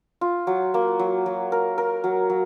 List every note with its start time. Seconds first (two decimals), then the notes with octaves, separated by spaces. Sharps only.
0.21 F4
0.47 F#3
0.74 A#3
0.99 F#3
1.26 F#3
1.52 A#4
1.78 A#4
2.04 F#3
2.30 F#3